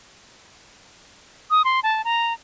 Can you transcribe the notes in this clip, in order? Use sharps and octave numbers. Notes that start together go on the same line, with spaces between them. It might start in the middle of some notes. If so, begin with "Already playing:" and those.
D#6
C6
A5
A#5